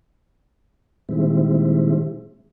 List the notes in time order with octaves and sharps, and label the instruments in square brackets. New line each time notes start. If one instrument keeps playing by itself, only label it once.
[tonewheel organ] A#2 D#3 G3 G#3 C4 E4